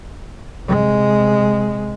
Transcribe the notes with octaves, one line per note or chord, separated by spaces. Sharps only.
C3 G#3